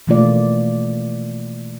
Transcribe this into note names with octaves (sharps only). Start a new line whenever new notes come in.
B2 E3 A3 A#3 F4 D5